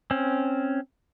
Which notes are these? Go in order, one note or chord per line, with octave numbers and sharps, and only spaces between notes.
C4 C#4